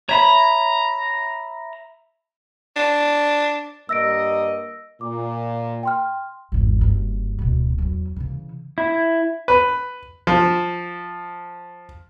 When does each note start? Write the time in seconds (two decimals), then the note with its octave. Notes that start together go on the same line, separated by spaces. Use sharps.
0.09 C#5 E5 A#5 B5
2.76 D4
3.89 G2 A#3 D#5 E6 A#6 D7
5.01 A#2 D6
5.83 G5 C6 F6
6.52 G#1 E2
6.81 F#1 G2
7.39 D1 B2
7.78 E2 F#3
8.16 C#3 E3
8.78 E4
9.48 B4
10.27 F3